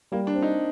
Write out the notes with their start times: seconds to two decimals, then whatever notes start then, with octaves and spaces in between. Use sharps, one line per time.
0.12 G3 A#3
0.27 D4
0.35 C4
0.42 D#4